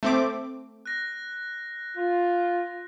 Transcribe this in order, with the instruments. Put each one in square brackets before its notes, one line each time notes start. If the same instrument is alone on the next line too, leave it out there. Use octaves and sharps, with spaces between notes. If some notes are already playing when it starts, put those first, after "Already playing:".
[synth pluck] A3 C4 D6
[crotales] F#6 A#6
[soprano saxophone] F4